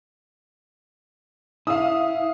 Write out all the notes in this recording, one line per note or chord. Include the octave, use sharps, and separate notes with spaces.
E4 F5 D#6